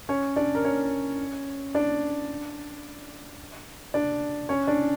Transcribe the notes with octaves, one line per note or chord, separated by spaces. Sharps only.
C#4 C#5
D4 D5
A#4
C#4 C#5
D4 D5
D4 D5
C#4 C#5
D4 D5